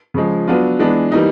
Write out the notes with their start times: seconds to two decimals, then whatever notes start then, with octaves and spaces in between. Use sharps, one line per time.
0.14 C#3 F3 G#3
0.48 F#3 B3 D4 F4
0.79 E3 G#3 B3 D4
1.12 E3 G3 A#3 D#4